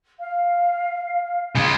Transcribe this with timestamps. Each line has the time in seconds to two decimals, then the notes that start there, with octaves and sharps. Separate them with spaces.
0.19 F5
1.55 C#3 G#3